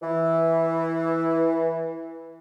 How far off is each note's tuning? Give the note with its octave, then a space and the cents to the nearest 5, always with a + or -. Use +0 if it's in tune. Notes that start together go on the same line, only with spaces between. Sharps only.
E3 -5